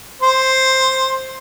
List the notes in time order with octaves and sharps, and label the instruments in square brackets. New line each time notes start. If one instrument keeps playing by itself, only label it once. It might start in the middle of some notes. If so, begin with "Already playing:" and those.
[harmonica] C5